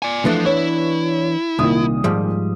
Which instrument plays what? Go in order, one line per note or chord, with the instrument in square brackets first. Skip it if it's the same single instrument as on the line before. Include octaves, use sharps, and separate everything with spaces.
[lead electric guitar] D5 G#5
[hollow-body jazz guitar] E3 B3 D4 [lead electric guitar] F3 [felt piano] A3
[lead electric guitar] E4 [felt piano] C#5
[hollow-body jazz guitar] C2 [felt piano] A#2 D#3 D#6
[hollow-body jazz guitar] G#2 F3 G3